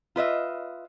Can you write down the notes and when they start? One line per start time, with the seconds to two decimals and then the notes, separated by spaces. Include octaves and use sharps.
0.16 F4 B4 D#5 E5